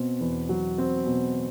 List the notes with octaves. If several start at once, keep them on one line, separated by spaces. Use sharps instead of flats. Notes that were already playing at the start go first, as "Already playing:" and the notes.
Already playing: B2 C4
E2
F#3
C4
B2